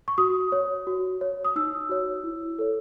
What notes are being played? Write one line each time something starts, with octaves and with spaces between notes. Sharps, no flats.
C#6
F#4 D#6
C#5
F#4
C#5
D#6
D#4 E6
F#4 C#5
E4
A4 C#5